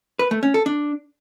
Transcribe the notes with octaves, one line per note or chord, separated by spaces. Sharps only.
B4
A3
C#4
A4
D4